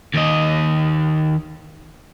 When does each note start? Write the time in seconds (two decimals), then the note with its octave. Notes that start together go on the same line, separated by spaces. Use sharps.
0.14 D#2 D#5